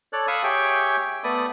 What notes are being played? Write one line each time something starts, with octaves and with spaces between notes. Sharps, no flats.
A4 C#5 D5 F#6
F5 B5 C#6 D#6 E6 F#6
G4 G#4 C#5 E5 G5 C#6
A3 B3 A4 D5 B5 D#6